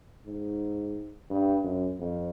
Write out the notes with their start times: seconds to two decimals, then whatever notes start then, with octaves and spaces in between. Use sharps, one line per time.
0.26 G#2
1.30 G2
1.64 F#2
1.99 F2